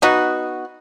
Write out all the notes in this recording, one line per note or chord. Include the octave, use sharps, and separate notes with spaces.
B3 D#4 F#4